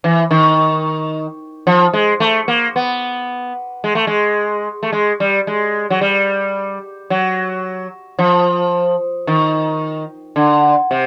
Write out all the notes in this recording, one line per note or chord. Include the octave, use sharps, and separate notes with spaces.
E3
D#3
F3
G#3
A3
A#3
B3
G#3
A3
G#3
A3
G#3
G3
G#3
F#3
G3
F#3
F3
D#3
D3
C3